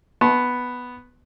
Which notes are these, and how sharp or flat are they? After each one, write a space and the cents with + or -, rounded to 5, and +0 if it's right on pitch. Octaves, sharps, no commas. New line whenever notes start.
B3 +0 A5 -25 C6 +40